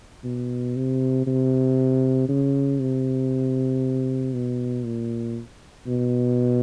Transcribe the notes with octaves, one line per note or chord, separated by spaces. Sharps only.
B2
C3
C3
C#3
C3
B2
A#2
B2